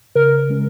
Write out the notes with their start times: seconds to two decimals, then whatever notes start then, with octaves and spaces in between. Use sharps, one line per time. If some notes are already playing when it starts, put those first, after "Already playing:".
0.15 C#3 A#4
0.50 G#3 C#4